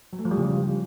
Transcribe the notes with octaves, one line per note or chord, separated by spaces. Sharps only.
F#3
A3
F3
G3
C#3